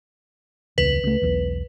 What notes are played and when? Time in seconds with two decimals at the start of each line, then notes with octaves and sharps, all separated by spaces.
0.78 E1 C#2 B4
1.03 C#2 A3
1.22 B1 E2